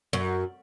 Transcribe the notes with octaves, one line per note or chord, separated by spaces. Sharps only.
F#2